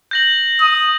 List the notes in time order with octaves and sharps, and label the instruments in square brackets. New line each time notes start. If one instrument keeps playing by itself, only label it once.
[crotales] G6 A#6 F#7
[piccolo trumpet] D#6